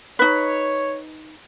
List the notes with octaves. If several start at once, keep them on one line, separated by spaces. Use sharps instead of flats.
D#4 B4 C#5